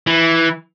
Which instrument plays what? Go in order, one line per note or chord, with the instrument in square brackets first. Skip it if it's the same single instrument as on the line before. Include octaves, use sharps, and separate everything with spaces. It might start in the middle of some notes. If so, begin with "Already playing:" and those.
[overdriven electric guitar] E3